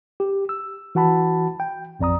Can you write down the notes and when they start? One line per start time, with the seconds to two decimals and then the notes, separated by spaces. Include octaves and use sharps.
0.20 G4
0.49 E6
0.95 E3 F#4 F#5 A5 B5
1.60 G5
1.99 A1 F2 D5 A#5 D#6